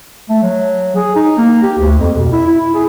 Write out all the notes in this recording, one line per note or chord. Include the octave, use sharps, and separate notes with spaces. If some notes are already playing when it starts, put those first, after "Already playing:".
A3
F#3
G#4
D#4
A#3
G4
D2
F2
B2
E4
E4
G#4